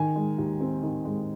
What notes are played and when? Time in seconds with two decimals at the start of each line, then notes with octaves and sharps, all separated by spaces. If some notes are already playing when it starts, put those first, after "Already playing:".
Already playing: D#3 G#5
0.16 G#3
0.38 D#2
0.60 C4
0.83 D#3
1.05 G#3